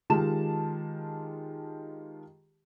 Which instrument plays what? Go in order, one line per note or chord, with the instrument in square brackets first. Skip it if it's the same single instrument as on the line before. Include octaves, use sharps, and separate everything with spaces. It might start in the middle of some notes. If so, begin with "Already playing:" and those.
[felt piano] D#3 G#3 F4 G4 A5 E7